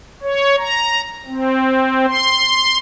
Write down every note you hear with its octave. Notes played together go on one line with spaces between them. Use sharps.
C#5
A#5
C4
C6